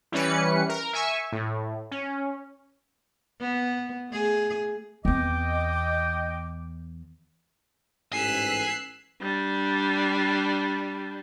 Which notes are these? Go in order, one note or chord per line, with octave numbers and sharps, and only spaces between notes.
E3 G3 C#4 B4 C#7
A#4
E5 G#5 C#6 E6
A2
C#4
B3
A3 G#4
E2 C4 D#5 G5 D6
A1 G#2 G#5 E6 F#6 B6 C7
G3 D4